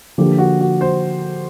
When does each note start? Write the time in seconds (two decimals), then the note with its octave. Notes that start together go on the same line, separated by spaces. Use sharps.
0.18 D3 F3 A#3 G4
0.38 F#4
0.60 F#4
0.81 C5